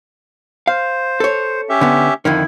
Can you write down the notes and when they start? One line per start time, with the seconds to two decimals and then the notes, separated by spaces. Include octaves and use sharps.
0.67 C5 F5
1.20 A4 C#5
1.69 C#4 G4 E5
1.81 D3 B3
2.25 F2 D3 D#3 E4